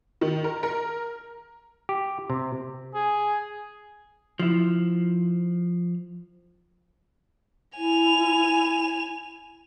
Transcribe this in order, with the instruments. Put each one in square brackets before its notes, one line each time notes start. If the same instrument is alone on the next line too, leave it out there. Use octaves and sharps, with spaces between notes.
[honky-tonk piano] D#3
A#4
A#4
[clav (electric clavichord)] G4
C3
[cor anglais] G#4
[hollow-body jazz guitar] F3 E4
[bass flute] E4 [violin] G#5 F7